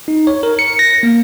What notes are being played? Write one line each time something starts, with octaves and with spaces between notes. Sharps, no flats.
D#4
C#5
A#4
C#7
A#6
A#3